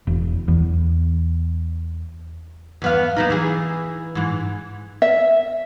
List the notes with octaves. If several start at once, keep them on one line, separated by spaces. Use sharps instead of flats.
E1
E2
E2 B3 F5
A#3 B3 D#4
E3 G#4
G#2 E3
E5